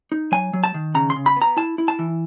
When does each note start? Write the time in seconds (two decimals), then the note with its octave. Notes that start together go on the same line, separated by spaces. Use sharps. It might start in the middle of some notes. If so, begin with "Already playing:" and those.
0.12 D#4
0.32 F#3 G#5
0.53 F#3
0.64 A5
0.74 D#3
0.95 C#3 A#5
1.10 C6
1.16 C#3
1.26 B5
1.36 B3
1.42 A#5
1.57 E4 A5
1.78 E4
1.88 A5
1.99 E3